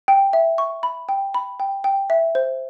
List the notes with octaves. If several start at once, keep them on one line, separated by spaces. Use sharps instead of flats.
G5
E5
C#6
B5
G5
B5
G5
G5
E5
C5